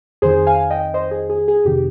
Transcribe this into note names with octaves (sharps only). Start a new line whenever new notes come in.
F2 D#3 G#4 C5
F5 G#5
D#5 G5
C5 D#5
G#4
G#4
G#4
F2 C3 D#3 G4